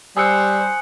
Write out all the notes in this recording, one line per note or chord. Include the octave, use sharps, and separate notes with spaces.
G3 C5 G#5 D#6 E6 F#6 C#7